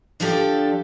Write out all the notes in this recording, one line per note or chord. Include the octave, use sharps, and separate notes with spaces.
D3 F3 D4 G4 A4